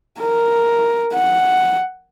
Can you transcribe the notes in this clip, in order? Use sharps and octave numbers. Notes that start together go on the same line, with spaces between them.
A#4
F#5